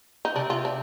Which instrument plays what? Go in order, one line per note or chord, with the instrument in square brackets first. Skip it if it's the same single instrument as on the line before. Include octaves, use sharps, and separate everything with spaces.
[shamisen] D#4
[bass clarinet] C3 [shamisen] D4
[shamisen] F4
D4